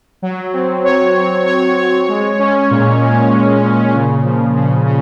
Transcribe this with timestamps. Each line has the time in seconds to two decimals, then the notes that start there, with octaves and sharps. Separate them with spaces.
0.22 F#3
0.53 C4
0.84 C#5
1.16 C4
1.46 C#5
1.77 C#5
2.09 G#3
2.39 C#4
2.71 A#2
3.01 A#2
3.33 G#3
3.63 A#2
3.94 C#3
4.24 F3
4.56 C#3
4.86 C#3